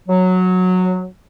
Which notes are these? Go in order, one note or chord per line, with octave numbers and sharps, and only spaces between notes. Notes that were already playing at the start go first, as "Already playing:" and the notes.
F#3